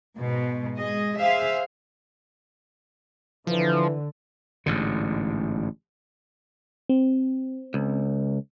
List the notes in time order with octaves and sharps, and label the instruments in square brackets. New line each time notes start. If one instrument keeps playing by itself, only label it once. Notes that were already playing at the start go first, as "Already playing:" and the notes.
[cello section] G#2 B2 G#3
G#3 G#4 D#5
G#4 C5 E5 F5
[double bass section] D3 [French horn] E3 [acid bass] F3
[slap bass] A1 G#2 D3
[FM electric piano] C4
[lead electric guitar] C#2